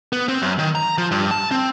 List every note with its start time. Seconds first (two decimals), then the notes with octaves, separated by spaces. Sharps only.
0.13 B3
0.28 C4
0.42 F#2
0.59 D#3
0.75 A#5
0.98 F3
1.11 G2
1.31 A5
1.51 C4